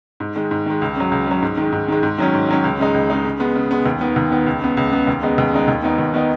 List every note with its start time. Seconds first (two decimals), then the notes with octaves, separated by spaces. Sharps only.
0.20 G#2
0.36 D#3 G#3
0.51 G#2
0.66 D#3 G#3
0.82 C#2
0.96 C#3 F#3
1.12 C#2
1.27 C#3 F#3
1.42 G#2
1.57 D#3 G#3
1.72 G#2
1.88 D#3 G#3
2.03 G#2
2.18 D#3 F#3 C#4
2.34 G#2
2.49 D#3 F#3 C#4
2.64 C#2
2.79 C#3 G#3 D#4
2.94 C#2
3.10 C#3 G#3 D#4
3.25 C#3
3.40 G#3 B3
3.55 C#3
3.71 G#3 B3
3.86 D#2
4.01 D#3 B3
4.16 D#2
4.31 D#3 B3
4.46 C#2
4.62 C#3 B3
4.77 C#2
4.92 C#3 B3
5.07 D#2
5.23 C#3 G#3 B3 D#4
5.38 D#2
5.53 C#3 G#3 B3 D#4
5.68 D#2
5.83 D#3 B3 D#4
5.98 D#2
6.14 D#3 B3 D#4